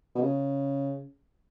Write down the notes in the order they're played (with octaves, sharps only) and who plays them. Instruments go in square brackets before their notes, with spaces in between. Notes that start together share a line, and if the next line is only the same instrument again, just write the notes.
[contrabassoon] B2
C#3